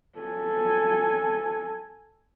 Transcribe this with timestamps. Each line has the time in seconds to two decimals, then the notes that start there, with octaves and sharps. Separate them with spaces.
0.18 A4 G#5